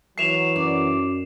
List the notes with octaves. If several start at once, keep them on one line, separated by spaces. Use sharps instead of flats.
E3 F#3 E5 C#6 C7 E7 F7
F#2 D5